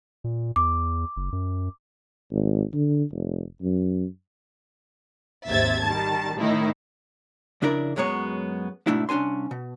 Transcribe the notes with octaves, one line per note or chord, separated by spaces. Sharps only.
A#2
E2 D6
F#1
F#2
G#1
D3
F1
F#2
G#1 D#2 C3 E5 G#6 A6
D#3 G3 A5 A6
A2 D#3 D#4 E4
F2 C#3 D4 E4 A#4 D5
F#2 F#3 G#3 B3 C#5
G#2 B2 A3 D4 E4
C2 C#4 D4 G#5 C6
B2